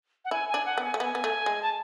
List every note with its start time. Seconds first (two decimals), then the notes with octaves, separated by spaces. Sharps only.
0.25 F#5
0.31 E4 G#5
0.49 G#5
0.54 D4
0.66 F#5
0.78 B3
0.84 G#5
0.94 A3
1.00 B3 G#5
1.15 B3
1.24 A3
1.46 G#3
1.62 A5